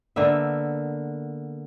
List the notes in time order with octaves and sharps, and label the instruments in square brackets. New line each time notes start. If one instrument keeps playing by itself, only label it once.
[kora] D3 A#3 B3 E5